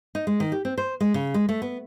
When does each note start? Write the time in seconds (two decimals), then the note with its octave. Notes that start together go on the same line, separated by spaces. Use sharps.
0.15 D#4
0.27 G#3
0.40 D#3
0.52 G4
0.65 C4
0.78 C5
1.00 G#3
1.14 C#3
1.34 G#3
1.49 A3
1.62 B3